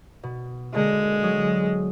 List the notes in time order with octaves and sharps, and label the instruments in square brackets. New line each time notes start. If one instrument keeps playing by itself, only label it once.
[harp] B2
[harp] D3 A#3 [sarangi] G#3
[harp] F#3 D#6